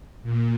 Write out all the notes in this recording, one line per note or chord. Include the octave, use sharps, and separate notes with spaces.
A#2